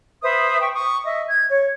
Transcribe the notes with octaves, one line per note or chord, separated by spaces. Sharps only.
B4 C5 E5 D#6
G5 C#6
C#6 D#6
D#5 E5
G#6
C#5